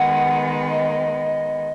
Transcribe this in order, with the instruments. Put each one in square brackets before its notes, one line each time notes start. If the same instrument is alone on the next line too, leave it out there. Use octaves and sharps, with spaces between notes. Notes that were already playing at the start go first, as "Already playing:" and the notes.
Already playing: [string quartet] D#3 G#3 B3 [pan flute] F#5
[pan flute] D#5